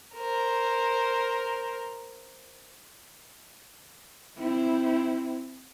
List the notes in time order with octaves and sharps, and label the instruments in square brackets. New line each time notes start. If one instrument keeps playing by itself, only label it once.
[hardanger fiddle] A#4 C5
[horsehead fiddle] C4 E4